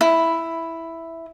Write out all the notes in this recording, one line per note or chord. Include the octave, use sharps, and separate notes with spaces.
E4